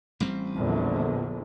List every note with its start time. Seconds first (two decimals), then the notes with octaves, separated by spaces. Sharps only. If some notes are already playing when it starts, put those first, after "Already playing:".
0.20 A1 G3 C4
0.55 A#1 E2 D3